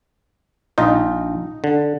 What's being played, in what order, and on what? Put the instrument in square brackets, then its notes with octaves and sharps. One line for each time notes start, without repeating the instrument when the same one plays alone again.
[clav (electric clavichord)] A#1 F4 [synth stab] D#4
[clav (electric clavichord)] D3